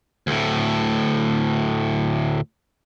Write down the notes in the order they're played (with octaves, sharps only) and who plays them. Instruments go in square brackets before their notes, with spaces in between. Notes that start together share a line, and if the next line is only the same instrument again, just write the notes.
[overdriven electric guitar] D2 A2